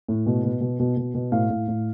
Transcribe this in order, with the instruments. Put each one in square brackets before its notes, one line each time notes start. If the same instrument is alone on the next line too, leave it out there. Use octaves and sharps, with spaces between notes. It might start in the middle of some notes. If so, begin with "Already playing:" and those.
[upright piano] A2
B2
B2
B2
B2
B2
B2
A2 F5
A2
A2